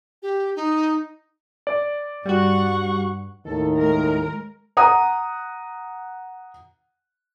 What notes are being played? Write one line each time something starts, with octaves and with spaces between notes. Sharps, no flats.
G4
D#4
D5
G2 G3 F#4 F#5 C#6
D#2 A2 D#3 A4
G#3 A#4
F#5 A#5 D#6